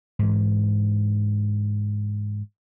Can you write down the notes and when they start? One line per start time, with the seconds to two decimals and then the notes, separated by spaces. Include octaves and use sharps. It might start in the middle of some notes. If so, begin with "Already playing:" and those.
0.19 G#2 E3